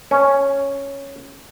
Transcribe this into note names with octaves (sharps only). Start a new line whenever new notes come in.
C#4